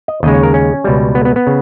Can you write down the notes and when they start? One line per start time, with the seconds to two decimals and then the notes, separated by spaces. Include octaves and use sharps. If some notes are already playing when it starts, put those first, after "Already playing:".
0.08 D#5
0.23 D#2 C#3 G#3 D#5
0.34 C#5
0.43 A#4
0.54 C#4
0.84 C#2 B2 G3
1.15 B3
1.25 B3
1.36 B3
1.47 C#3